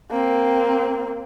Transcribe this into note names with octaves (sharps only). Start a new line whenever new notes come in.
A#3 C4